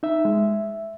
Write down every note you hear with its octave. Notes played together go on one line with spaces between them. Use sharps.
D#4 E5
G#3